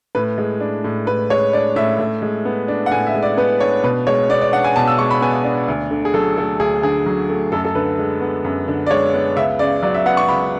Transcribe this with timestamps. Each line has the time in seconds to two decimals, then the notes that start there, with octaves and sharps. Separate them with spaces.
0.15 A2 B4
0.38 G#3
0.60 D4
0.84 A2
1.07 A2 B4
1.30 G#3 C#5
1.53 D4 D5
1.76 A2 E5
1.99 A2
2.22 G#3
2.45 B3
2.68 D4
2.86 F#5
2.91 A2 G#5
3.07 E5
3.14 G#3
3.22 D5
3.37 B3 B4
3.60 D4 C#5
3.84 B2 B4
4.07 G#3 C#5
4.30 B3 D5
4.41 D5
4.52 D4 F#5
4.64 G#5
4.76 B2 A5
4.87 E6
4.98 G#3 C#6
5.11 B5
5.22 B3 G#5
5.44 D4
5.68 D2
5.91 D3
6.05 G#4
6.14 F#3 A4
6.37 A3 A4
6.60 D2 G#4
6.83 D3 G#4
7.06 F#3
7.30 A3
7.52 F#2 A4
7.65 A4
7.75 D3 B4
7.98 G#3
8.21 B3
8.44 F#2
8.68 D3
8.86 D5
8.90 G#3 C#5
9.14 B3
9.36 C#2 E5
9.59 C#3 D5
9.83 F#3 D5
9.94 E5
10.06 B3 F#5
10.17 C#6
10.28 C#2 B5